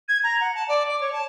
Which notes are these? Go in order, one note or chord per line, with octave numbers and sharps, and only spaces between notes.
G#6
A#5
F#5
A5
D5
D6
C#5
A5